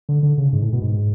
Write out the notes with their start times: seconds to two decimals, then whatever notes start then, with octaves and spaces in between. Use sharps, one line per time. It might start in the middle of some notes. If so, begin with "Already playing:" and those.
0.09 D3
0.23 D3
0.38 C#3
0.53 G#2
0.62 A2
0.73 B2
0.82 G#2